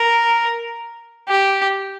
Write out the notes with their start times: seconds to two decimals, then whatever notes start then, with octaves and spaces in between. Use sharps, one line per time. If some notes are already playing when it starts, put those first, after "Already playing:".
Already playing: A#4
1.28 G4